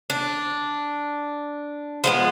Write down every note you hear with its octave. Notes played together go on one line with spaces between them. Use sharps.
D4
F3 G#3 B3